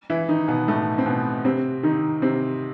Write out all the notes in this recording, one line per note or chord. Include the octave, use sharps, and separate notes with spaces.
E3 E4
D#3 D#4
B2 B3
A2 A3
C4
B2 B3
C3 C4
D#3 D#4
C3 C4